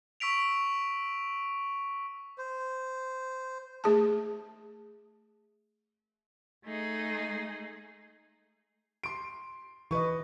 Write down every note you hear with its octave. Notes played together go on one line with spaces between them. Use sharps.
C#6 E6 B6 D7 F7
C5
A3 G#4 A5
A3 D#4 G#4
C6 D7
E3 B4 D#5 C#6